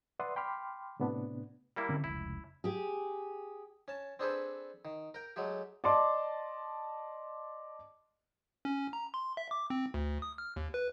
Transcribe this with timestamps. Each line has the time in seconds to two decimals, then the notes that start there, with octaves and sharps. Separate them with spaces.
0.20 B4 D5 E5 F#5 C6 D#6
0.36 G5 B5 C6 D6 F6
1.00 A2 C3 B3 D4
1.76 G3 A#3 E4
1.89 D3 C4 C#4
2.04 F1 C#2 E4
2.64 G4 G#4
3.88 C#4 A5
4.19 C4 D4 G#4 A4 B4 C5
4.85 D#3
5.14 A#4 G5
5.36 F#3 G#3 A3 G4
5.84 D5 D#5 A5 C6 D6
8.65 C#4
8.93 A#5
9.14 C6
9.37 E5
9.51 D6
9.70 C4
9.94 D2
10.22 D#6
10.38 F6
10.56 D#2
10.74 B4